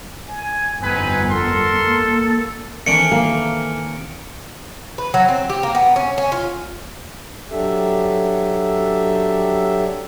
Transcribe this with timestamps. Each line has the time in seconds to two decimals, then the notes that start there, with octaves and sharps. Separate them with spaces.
0.28 G#5
0.81 G1 F2 B3 C4 D#4 B4 G#5
1.28 A4 A#4 C6
1.88 A#3
2.86 D#3 E3 A3 C4 D4 A#4 C#7 D7
3.12 A#3
4.98 B4
5.14 F#3
5.29 C4
5.50 G4
5.63 A#3
5.75 B3
5.96 C#4
6.18 C#4
6.32 F4
7.51 F#3 D4 G4 A4 E5